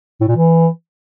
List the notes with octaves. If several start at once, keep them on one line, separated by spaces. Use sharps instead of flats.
A2
A#2
E3